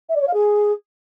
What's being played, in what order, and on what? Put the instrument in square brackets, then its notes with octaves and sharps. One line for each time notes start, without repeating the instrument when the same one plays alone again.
[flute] E5
D5
C#5
F5
G#4